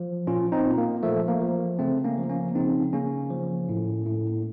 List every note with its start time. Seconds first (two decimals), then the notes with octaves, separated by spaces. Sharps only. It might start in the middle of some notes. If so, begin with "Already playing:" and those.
Already playing: F3
0.27 A#2 C#4 F4
0.52 C4 D#4
0.65 A#2
0.78 A#3
1.03 F3 A3
1.28 A#3
1.41 F3
1.79 C#3 A3 C4
2.04 A#3 C#4
2.17 F3
2.29 A#3 C#4
2.55 C#3 C4 D#4
2.93 C#3 A#3 C#4
3.30 F3
3.69 A2
4.06 A2